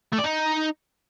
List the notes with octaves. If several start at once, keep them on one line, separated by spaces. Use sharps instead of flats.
A3
D5
D#4